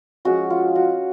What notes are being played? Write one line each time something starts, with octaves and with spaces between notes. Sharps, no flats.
F3 G#3 C#4 F#4
F4
F#4